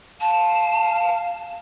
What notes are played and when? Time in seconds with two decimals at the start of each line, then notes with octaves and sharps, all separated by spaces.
0.21 F5 A5